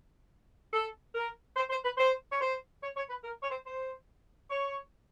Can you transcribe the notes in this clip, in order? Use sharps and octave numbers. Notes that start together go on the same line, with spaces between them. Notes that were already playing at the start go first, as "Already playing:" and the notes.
A4
A#4
C5
C5
B4
C5
C#5
C5
C#5
C#5
B4
A#4
C#5
C5
C5
C#5